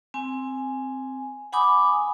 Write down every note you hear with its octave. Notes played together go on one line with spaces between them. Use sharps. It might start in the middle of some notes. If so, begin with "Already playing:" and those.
C4 G#5
F#5 G#5 B5 D6 D#6